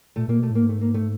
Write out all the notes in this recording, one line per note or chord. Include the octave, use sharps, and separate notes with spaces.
A#2 A3
A#2 A#3
B2 A3
A2 A#3
G#2
A3
A#3
A3